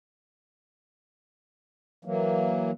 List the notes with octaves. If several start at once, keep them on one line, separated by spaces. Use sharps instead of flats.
E3 F#3 A#3